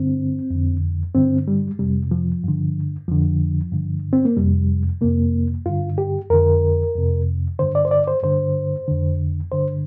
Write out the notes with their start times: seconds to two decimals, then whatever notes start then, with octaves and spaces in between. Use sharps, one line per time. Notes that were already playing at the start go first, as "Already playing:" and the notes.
Already playing: G2 D3 C4
0.50 F2 D3
1.15 G2 D3 C4
1.48 G3
1.79 F2 C3 G3
2.11 F3
2.44 G2 D3
3.08 F2 D3 F3
3.72 G2 D3
4.13 C4
4.25 A#3
4.37 F2 C3 G3
5.01 F2 C3 A#3
5.66 G2 D3 F4
5.98 G4
6.30 F2 D3 A#4
6.95 F2 C3
7.59 G2 D3 C5
7.75 D5
7.85 C5
7.91 D5
8.08 C5
8.23 G2 D3 C5
8.88 F2 D3
9.52 G2 D3 C5